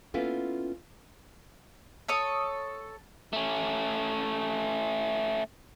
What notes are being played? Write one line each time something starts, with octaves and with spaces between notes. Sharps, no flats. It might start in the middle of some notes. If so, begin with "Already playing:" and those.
A#3 B3 C#4 E4 F4 A4
A4 C#5 D#6
A3 C#4